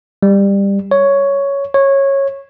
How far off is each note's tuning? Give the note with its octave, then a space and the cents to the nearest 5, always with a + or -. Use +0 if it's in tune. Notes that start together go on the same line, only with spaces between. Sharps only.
G3 +20
C#5 +5
C#5 -15